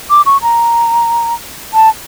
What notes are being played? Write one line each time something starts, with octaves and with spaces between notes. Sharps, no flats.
D6
C#6
A#5
A5